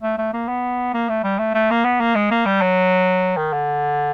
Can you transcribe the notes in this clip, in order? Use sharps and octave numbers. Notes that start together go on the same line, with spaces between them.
A3
A3
A#3
B3
A#3
A3
G3
A3
A3
A#3
B3
A#3
G#3
A#3
G3
F#3
D#3
D3